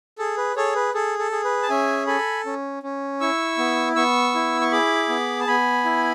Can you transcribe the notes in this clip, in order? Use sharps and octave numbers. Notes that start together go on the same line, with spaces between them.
G#4 A4
B4
G#4 A4 C#5
B4
G#4 A4
A4
G#4
B4
A5
C#4 E5 G#5
A4 G#5 B5
C#4
C#4
E4 C#6 E6
B3
B3 C#6 E6
E4
C#6
G#4 B5 D6
B3
A5
B3 G#5 B5
E4